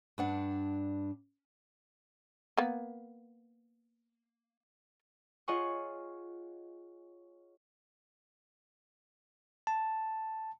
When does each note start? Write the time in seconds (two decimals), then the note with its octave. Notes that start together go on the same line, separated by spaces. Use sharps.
0.18 G2 D4 F#5
2.57 A#3 B3
5.48 F4 G#4 C#5 D#5 F#5 C#6
9.67 A5